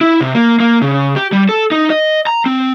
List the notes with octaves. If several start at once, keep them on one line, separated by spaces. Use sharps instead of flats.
E4
C3
A#3
A#3
C#3
G4
G3
A4
D#4
D#5
A#5
C4